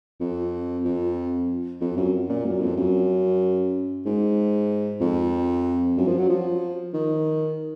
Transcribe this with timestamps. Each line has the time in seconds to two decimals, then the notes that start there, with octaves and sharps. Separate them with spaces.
0.20 F2
0.85 F2
1.81 F2
1.97 F#2
2.29 A#2
2.45 F#2
2.61 F2
2.77 F#2
4.06 G#2
5.01 F2
5.98 F#2
6.08 F3
6.18 F#3
6.29 F3
6.94 D#3